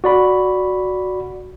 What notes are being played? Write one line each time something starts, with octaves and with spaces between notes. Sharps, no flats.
F#4 D5 B5